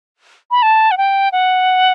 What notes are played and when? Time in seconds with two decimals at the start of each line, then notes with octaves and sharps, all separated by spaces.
0.51 B5
0.62 A5
0.91 F#5
0.98 G5
1.32 F#5